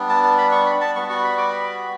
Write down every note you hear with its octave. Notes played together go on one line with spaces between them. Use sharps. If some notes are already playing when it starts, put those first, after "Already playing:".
Already playing: G3 B3 D4
A5
A5
B5
C#6
B5
A5
G3 B3 F#4 C#6
C#6
B5
D6
B5